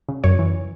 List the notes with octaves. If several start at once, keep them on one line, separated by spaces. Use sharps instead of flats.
C#3
F#2 C#5
E3